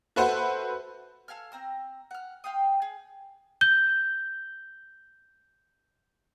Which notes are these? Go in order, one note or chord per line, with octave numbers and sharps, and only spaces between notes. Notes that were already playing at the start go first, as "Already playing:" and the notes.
F#4 A4 B4 C5 E5 F#5
A4 F5 G#5 F6
C4 A#5 E6
F#5 F6
F5 G5 C6 D#6
G#4
G6 G7